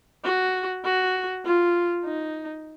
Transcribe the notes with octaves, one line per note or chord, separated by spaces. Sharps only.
F#4
F#4
F4
D#4